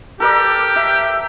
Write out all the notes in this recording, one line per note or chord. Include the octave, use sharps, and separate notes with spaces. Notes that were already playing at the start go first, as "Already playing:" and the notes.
G4 A4 A#4 D5
E5